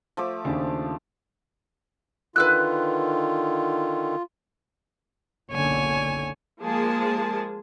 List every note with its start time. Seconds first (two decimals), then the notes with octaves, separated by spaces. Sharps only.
0.17 F3 A3 D6
0.44 D#2 C#3 D4
2.36 D3 D#3 F4 B4 E6 F#6
5.51 F#1 B1 D3 C#5 G#5
6.60 F3 G#3 A#3 G#4 A5